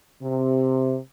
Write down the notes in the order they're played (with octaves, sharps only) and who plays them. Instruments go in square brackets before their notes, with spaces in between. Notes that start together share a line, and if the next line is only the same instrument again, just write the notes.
[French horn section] C3